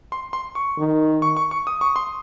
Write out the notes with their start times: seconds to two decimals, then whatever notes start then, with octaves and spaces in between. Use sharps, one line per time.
0.12 C6
0.33 C6
0.55 C#6
0.78 D#3
1.22 C#6
1.37 C#6
1.51 C#6
1.67 D#6
1.81 C#6
1.96 C6